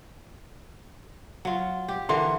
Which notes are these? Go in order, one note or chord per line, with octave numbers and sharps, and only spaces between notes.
F#3 F4
G4
D3 E3 A#4 C6